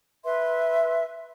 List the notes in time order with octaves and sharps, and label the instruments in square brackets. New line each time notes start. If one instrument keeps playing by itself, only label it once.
[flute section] B4 E5 C6